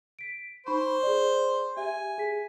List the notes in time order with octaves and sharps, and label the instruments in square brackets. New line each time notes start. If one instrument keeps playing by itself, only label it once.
[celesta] B6 D7
[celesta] D#4 B5 C#6 [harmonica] C5
[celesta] G#4 D5
[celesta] G4 E5 [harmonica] G#5
[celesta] G#4 B6